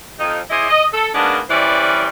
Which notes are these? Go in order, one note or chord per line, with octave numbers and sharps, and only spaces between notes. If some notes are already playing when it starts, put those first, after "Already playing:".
F2 D#4
E4 G#4 C5 D5 D#5
D#5
A4
G#2 A#3 B3 C#4 D4
E3 G3 C#4 B4 C5 D5